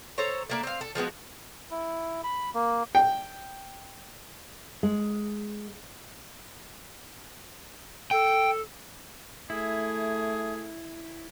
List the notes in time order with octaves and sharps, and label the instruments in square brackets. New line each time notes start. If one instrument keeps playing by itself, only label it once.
[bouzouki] A4 C5 C#5 A#5
A3 A#3 D4
C4 F5
A4
F3 G#3 B3 F#4
[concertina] E4
B5
A#3
[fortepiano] G5
[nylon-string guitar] G#3
[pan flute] A4 [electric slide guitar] G5
[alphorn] A3 [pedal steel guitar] E4 [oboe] G#4